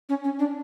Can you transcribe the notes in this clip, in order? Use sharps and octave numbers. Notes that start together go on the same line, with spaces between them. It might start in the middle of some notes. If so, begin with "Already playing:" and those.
C#4
C#4
D4